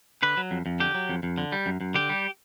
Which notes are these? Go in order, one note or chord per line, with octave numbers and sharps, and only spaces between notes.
D3 B4
F#3
F2
F2
D3 G4
F#3
F2
F2
D3
G3
F#2
F#2
D3 G4
G3